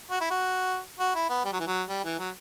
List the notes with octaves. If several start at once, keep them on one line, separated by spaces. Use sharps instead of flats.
F#4
E4
F#4
F#4
E4
B3
G3
F#3
E3
F#3
G3
E3
F#3